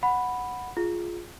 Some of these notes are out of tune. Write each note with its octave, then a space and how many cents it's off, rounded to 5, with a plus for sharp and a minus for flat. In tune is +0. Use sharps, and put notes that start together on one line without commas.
F#5 -5 B5 +0
F4 +0 G#4 +0